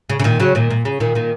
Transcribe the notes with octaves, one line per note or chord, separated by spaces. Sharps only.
C#3
C#3
A#2 D#3
C#3 F#3
A#2 D#3
A#2
C#3
A#2 D#3
A#2 D#3